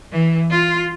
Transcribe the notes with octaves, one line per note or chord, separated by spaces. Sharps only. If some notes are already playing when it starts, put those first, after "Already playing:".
E3
F4